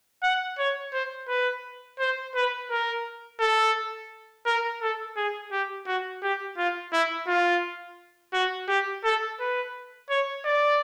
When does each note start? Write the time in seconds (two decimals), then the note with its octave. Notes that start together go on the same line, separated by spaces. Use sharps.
0.23 F#5
0.58 C#5
0.93 C5
1.29 B4
1.99 C5
2.35 B4
2.70 A#4
3.40 A4
4.46 A#4
4.82 A4
5.17 G#4
5.52 G4
5.86 F#4
6.23 G4
6.58 F4
6.92 E4
7.28 F4
8.33 F#4
8.68 G4
9.04 A4
9.40 B4
10.10 C#5
10.45 D5